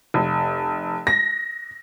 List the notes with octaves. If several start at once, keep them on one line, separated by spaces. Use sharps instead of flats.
F1
A#6